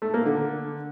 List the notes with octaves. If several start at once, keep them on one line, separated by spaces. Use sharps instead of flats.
A3
A#3
D3